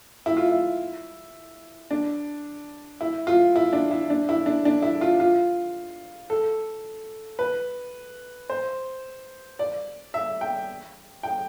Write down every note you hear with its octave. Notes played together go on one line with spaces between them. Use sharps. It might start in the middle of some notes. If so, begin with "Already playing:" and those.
E4
F4
E4
D4
E4
F4
E4
D4
E4
D4
E4
D4
D4
E4
F4
F4
A4
B4
C5
D5
E5
G5
G5